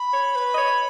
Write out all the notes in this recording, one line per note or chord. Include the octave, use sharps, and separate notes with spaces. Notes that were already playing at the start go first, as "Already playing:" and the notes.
Already playing: B5
C#5
B4
D#5
C#5